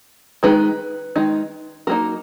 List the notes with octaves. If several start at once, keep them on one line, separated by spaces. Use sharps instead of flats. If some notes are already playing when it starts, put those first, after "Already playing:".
D#3 G#3 D#4 B4
D#3 G#3 D#4
F#3 A#3 D#4 A#4